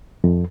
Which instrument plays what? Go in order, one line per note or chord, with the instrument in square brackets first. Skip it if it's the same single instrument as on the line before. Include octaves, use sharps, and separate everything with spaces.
[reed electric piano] F2